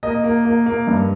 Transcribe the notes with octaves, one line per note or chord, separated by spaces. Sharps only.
A#3 D#5
A#3
A#3
A#3
G2